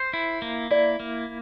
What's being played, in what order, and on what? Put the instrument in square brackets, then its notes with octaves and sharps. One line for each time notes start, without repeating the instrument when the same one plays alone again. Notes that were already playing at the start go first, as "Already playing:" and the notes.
Already playing: [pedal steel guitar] C5
E4
A#3
[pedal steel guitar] E4 [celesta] D5
[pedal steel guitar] A#3